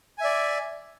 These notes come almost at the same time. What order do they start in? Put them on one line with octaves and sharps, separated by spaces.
G#5 E5 D5